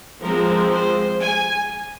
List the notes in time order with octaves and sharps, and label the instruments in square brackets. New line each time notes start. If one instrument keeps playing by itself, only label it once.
[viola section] F3 G#3 C4 A#4
C5
G#5